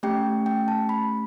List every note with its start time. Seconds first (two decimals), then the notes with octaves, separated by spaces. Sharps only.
0.03 A3 C#4 G4 G5
0.46 G5
0.68 A5
0.89 B5